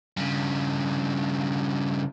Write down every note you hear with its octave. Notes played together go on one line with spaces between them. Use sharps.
G2 C#3